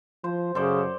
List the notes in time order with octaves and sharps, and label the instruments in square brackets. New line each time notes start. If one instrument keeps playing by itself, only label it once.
[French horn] F3 [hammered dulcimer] C5
[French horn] F#2 [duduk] C#3 [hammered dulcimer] A4 C5 D5